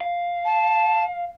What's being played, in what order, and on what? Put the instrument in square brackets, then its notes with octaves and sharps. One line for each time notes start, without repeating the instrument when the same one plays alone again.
[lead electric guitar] F5
[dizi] A5